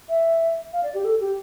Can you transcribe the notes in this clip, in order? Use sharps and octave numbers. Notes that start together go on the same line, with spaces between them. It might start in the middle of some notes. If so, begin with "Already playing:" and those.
E5
F5
D5
G4
A4
G4